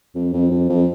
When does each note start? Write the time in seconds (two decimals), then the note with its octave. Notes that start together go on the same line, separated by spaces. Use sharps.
0.15 F2
0.33 F2
0.51 F2
0.69 F2